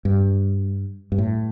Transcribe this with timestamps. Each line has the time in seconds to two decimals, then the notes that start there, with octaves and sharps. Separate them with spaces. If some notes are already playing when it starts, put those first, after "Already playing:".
0.05 G2
1.12 G2
1.18 A2